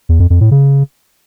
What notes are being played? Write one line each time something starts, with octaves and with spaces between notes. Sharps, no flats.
E2
F2
F2
A2
C#3